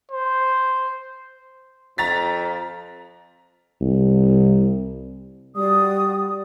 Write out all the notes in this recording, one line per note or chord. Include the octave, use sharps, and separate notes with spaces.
C5
F2 A#5 A6 B6
C2
G3 F#4 D5 D#6